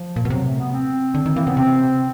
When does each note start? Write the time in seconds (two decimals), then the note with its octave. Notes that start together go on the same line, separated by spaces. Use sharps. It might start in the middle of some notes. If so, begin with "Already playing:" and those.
Already playing: F3
0.16 A#2
0.25 B2
0.30 C3 F#3
0.45 A3
0.59 B3
0.73 C4
1.14 D3
1.26 D#3
1.35 E3 A#3
1.46 C#3 B3
1.57 C3 C4